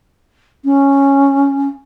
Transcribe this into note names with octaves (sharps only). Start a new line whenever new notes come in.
C#4